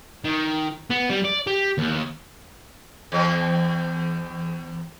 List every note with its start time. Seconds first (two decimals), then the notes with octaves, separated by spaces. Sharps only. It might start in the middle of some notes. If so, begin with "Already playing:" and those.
0.24 D#3
0.90 B3
1.10 G3
1.25 D5
1.47 G4
1.78 D#2
3.12 E2 C4